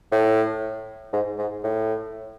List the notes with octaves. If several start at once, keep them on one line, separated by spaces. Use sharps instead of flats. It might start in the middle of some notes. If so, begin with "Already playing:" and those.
A2
G#2
G#2
A2